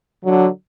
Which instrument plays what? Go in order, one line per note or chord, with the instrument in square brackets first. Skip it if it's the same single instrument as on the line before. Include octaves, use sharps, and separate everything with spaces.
[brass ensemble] D3 F#3